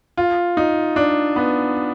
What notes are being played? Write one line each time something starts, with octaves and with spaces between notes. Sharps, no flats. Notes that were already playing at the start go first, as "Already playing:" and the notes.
F4
D#4
D4
B3